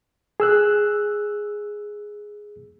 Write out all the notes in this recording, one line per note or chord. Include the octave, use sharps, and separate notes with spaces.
G#4 E6 F#6